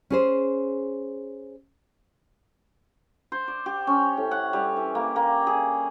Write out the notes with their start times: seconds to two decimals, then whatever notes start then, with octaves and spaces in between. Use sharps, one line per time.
0.10 C#4 G#4 C5
3.32 C5
3.48 D5
3.66 G4
3.87 C#4
4.17 A2
4.31 F#5
4.53 G3
4.77 E3
4.95 A#3
5.16 A#3
5.47 G#4